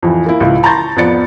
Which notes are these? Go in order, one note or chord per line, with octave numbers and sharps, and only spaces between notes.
F2 E3
A#3 E4
C#2 E4
A5 A#5 C6 C#6 G6 A6
F2 B3 D5 A6 C#7